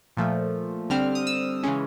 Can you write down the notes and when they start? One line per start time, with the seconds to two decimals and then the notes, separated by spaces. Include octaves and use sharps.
0.17 A#2 F3 A3
0.90 D3 G3 C4 F6
1.15 D#6
1.27 E6
1.63 C#3 E3 G#3 C#4